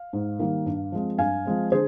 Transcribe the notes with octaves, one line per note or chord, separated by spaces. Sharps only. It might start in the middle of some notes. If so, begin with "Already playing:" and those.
Already playing: F5
G#2
D#3 G3 A#3
G2
F3 G#3 C4
G2 F5 G#5
F3 G#3 C4
D3 G#4 C5